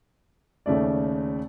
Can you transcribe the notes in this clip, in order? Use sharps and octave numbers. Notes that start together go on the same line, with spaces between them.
D#2 C#3 A3 D5